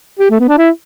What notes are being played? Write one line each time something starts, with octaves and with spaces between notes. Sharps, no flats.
G4
A3
B3
D4
E4